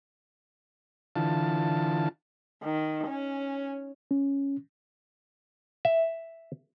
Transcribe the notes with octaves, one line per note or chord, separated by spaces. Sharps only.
D3 E3 F4 A5
D#3
C#4
C#4
E5